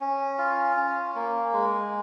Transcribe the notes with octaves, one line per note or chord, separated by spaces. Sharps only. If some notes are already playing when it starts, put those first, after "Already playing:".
C#4
F4
C#4
A#3
G#3